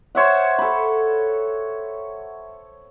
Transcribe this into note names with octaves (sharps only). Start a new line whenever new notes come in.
C5 C#5 E5 F#5
A4 B5